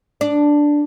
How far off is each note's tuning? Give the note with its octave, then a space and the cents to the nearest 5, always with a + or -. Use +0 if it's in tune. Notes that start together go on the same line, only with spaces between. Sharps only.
D4 +0